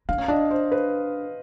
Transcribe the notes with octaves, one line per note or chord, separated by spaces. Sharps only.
D4 F5
C#4
D4 D#5
C5
B4